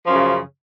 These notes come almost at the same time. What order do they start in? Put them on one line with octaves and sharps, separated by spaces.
F3 F#2 C#3